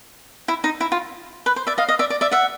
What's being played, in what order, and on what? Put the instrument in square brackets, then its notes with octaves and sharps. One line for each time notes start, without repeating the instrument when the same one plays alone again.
[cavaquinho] E4
D#4
E4
F4
B4
C5
D5 E5
D#5 F5
D#5 F5
D5 E5
D5
D5 E5
E5 F#5